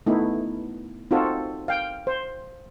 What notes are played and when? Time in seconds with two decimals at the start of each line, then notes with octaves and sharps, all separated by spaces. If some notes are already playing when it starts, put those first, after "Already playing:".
0.07 A3 B3 D#4 E4
1.11 C4 D#4 F4 F#4 A4
1.68 F5 G5
2.07 C5